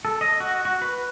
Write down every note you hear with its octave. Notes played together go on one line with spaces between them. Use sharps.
A4
D#5
F#4
F#4
B4